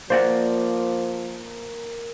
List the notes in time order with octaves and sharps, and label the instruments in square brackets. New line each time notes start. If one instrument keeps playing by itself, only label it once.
[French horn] F3 [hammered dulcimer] A#3 [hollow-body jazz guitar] C5 D5 F#5